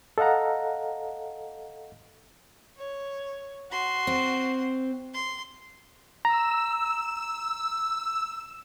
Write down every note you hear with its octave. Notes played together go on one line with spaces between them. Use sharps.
A4 D#5 F5 F#5 A#5
C#5
F#4 C6
C4
C6
A#5 E6